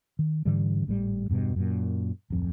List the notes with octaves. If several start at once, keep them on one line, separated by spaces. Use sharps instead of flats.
D#3
G#2 D3 E3 G3
G#1 A2 E3 G3
E1 G2 B2
F#2 A#2
D1 F2